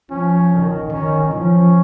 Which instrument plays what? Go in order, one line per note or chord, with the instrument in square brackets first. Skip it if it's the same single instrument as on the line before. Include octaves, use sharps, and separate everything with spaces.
[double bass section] F3 [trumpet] C#4
[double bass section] D#3
[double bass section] D#3 [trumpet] C#4
[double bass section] F3 [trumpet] C#4